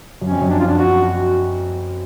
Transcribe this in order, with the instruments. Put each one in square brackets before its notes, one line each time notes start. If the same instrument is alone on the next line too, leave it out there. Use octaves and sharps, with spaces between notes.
[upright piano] F#2 [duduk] C#4
[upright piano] F2
F#2
[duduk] D4
F4
D4
F#4